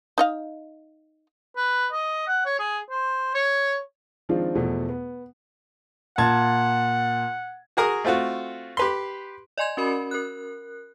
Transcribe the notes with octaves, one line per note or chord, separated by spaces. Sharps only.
D#4 D#5 F5
B4
D#5
F#5
C#5
G#4
C5
C#5
D#3 F3 G#3 C4 D4 F4
E2 B2 F3 A3
B3
A#2 F#5 A5 G#6
F#4 G#4 A#4 D#6
A3 C4 F4 F#4
G4 B4 C6
D5 D#5 G#5 C6 G#6
C#4 F#4 A#4 B5
A#4 F#6